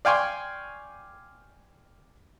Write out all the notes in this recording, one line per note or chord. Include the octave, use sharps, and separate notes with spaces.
D5 F5 G5 G#5 C6 C#6